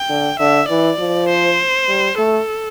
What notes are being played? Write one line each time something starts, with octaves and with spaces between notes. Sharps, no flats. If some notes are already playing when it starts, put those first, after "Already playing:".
Already playing: G5
D3
D3 E5
E3 D5
F3
C5
G3
A3 A4